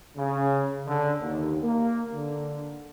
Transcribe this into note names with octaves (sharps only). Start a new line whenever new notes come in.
C#3
D3
D#2
A#3
D3